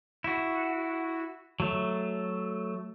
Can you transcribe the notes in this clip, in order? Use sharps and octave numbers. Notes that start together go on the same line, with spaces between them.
E4 F#4
F#3 A3